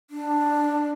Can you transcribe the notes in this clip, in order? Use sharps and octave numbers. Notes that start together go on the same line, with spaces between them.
D4